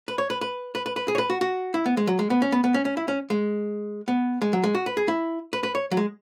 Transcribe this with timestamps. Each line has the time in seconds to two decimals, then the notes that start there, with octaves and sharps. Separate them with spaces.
0.08 B4
0.18 C#5
0.30 B4
0.41 B4
0.75 B4
0.86 B4
0.96 B4
1.08 G#4
1.15 C#5
1.18 B4
1.30 F#4
1.41 F#4
1.74 E4
1.86 B3
1.97 G#3
2.07 F#3
2.19 G#3
2.30 B3
2.42 C#4
2.52 B3
2.64 B3
2.74 C#4
2.85 C#4
2.97 E4
3.08 C#4
3.30 G#3
4.08 B3
4.42 G#3
4.53 F#3
4.64 G#3
4.75 F#4
4.86 B4
4.97 G#4
5.08 E4
5.53 B4
5.63 B4
5.75 C#5
5.91 F#3
5.97 G#3